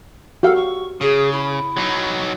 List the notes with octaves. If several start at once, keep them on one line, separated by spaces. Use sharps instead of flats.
F#4 G4 A4 F5
C#6
C#3 G#4
E4
F#3 D#4